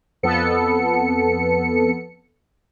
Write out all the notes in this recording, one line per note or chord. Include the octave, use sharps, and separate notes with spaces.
F2 B3 A4 C#7